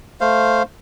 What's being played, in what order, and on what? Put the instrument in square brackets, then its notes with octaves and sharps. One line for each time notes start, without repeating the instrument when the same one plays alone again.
[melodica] A3 C5 F5